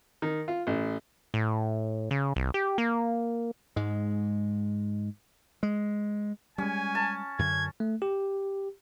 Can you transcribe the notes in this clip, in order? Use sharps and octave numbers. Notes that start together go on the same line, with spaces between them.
D#3
F4
A1
A2
C#3
C2
G4
A#3
G#2 G#3
G#3
G3 G#3 C#4 G#5
A5
F#2 D3 G#6
A3
G4